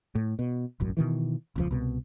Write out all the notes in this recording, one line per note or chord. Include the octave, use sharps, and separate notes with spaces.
A2
B2
E1 A1 F#2
B2 D#3 E3
E1 C#2 F3
C2 B2